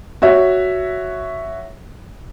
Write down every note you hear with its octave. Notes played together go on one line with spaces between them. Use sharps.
F#4 C#5 E5